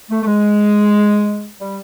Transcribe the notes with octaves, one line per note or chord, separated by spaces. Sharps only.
A3
A3
G#3
G3